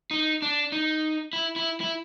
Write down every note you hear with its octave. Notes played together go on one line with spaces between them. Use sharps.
D#4
D4
D#4
E4
E4
E4